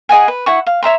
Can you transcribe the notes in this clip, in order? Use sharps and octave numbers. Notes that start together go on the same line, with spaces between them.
G#4 D#5 F#5 G#5
B4
E4 F#5 C#6
F5
C#5 E5 A#5 C6